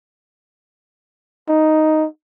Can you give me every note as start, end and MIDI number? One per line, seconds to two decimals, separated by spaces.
1.49 2.06 63